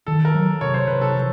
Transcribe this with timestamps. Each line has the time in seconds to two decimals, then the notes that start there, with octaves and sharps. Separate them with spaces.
0.06 D#3 A4
0.25 A#4
0.34 F#3
0.61 C3 C#5
0.74 C5
0.87 C3 B4
1.01 A4
1.15 F3